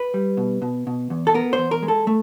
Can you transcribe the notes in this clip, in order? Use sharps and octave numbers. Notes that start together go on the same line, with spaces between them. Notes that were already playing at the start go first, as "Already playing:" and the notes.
Already playing: B4
G3
B2
B2
B2
E2
A4
B3 A#4
C5
E2
A#4
G#3
A4
A3